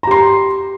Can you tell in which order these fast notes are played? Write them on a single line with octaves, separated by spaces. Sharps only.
A#5 G4 C6